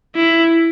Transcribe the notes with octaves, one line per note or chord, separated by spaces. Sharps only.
E4